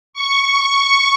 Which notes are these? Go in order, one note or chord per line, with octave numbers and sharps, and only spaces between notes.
C#6